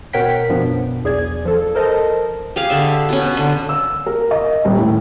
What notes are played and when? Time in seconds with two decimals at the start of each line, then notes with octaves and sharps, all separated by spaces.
0.13 B2 A#4 C#5 F#5 G5 B6
0.50 F#2 B2 F3 B3 D4
1.04 B1 E2 G#4 D5 G#6
1.45 F3 A4
1.75 A4 A#4 C5 D#5 A5
2.56 G4 G#4 F5
2.70 D3 E5
3.09 B2 C#4
3.37 D3
3.69 E6
4.06 A#4
4.31 D#5
4.65 D#1
4.78 A2